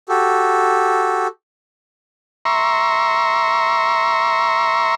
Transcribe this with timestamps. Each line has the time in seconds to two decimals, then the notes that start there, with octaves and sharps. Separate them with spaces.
0.09 F#4 G4 A4
2.45 E5 A#5 C6 C#6